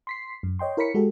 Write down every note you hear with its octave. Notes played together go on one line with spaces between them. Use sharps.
C6 B6 C7
F#2
C#5 D#5 G5 C6
E4 A#4 C#5 B5 B6 C#7
G#3 F#4 G4 A4